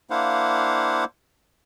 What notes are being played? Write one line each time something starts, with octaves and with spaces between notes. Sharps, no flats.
A#3 D4 E4 C5 F5 F#5